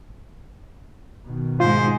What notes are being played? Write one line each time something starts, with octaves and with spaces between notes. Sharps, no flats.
B2 D#3
G#2 G#3 F4 C5